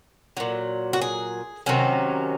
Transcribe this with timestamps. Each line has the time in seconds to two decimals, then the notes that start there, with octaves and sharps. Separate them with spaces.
0.37 A#2 F#3
0.93 F#4
1.02 G#4
1.66 C3 D#3 F#3 C#4